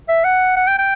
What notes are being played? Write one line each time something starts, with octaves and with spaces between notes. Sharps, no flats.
E5
F#5
F#5
G5
G5